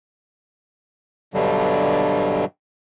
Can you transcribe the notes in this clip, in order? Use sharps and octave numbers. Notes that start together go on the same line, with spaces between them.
G2 B2 D3 F#3 G3